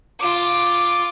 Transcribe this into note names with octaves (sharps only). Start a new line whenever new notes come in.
F4 D6